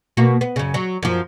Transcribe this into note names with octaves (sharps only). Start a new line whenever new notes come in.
B2 A#3 F#4
B3
F#2 C#3
F#3
F#2 F3